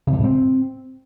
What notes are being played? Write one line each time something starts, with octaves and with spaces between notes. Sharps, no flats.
C#3
C3
G#2
C4